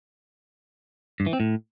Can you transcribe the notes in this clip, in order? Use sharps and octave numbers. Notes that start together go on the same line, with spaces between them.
G2
E3
C4
A2